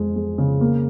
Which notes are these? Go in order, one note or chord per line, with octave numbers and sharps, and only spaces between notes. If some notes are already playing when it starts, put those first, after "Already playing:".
Already playing: F2 G#3
G#3
C#3
A#3